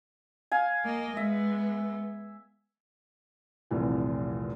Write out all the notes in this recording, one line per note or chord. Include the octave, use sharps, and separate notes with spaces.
F5 G#5
A#3 D#5
G#3 B3 E5
F1 C2 A#2 E3